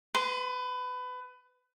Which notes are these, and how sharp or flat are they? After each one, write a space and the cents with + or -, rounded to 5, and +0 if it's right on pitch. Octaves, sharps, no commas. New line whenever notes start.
B4 +25 C6 -20